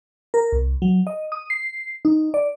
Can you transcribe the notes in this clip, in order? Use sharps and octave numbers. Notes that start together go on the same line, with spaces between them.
A#4
C2
F#3
D#5
D#6
C7
D#4
D5